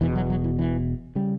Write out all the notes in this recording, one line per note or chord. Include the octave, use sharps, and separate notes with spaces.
E1 E2 B2 E3
F#3
F#3
E3
E3
C#3 G3